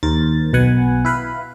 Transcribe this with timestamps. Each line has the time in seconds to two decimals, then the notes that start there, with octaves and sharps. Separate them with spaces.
0.03 D#2 A#4 C5 A6
0.53 B1 B2 B4 F#5 G#5
1.05 E4 B4 F5 B5